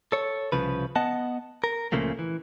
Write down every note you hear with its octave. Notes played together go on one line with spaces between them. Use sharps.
A4 C#5
C2 C#3 F3 B4
B3 D#5 F#5 A5
A#4
C#2 A#2 C#3 F3 A3 A#3
E3